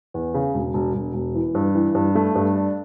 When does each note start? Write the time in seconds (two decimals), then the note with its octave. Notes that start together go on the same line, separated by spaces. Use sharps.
0.14 E2
0.34 C#3
0.54 E1
0.74 E1
0.94 E1
1.14 E1
1.35 E3
1.55 G2
1.75 E3
1.95 G2
2.15 A3
2.35 G2
2.55 D4